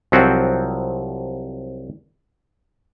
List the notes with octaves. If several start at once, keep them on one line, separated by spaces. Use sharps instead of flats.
C2 F3 F#3 C4 F#4